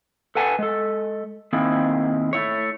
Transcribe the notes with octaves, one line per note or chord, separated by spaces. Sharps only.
A4 B4 F#5 G#5 A5
G#3 A4
D#3 A#3 C4 E4 G#4
A3 E4 C#5